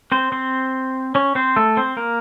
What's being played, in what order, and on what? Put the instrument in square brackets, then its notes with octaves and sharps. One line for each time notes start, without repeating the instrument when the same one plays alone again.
[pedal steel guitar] C4 C5
C4 C5
C#4 C#5
C4 C5
A3 A4
C4 C5
A#3 A#4